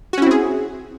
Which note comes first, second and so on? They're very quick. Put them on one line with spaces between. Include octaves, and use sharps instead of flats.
F#4 C#4 E4 C4 G#4